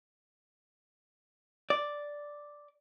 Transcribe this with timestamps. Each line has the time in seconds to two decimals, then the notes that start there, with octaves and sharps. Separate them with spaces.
1.70 D5